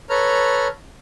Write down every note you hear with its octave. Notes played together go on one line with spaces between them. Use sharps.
A4 B4 C#5 A#5 F6